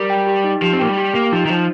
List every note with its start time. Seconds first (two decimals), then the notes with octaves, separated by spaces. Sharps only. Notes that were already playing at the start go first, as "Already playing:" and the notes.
Already playing: G3 A#4
0.10 G5
0.27 G4
0.44 D#4
0.62 F3 G4
0.73 C4
0.79 A#3 G5
0.89 G3
0.97 G4
1.15 A#3 G5
1.32 F3 D#4
1.45 D#3
1.49 F3 C5